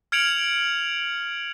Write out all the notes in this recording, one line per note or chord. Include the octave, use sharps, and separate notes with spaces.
F6 G#6 C#7 D7 F7 F#7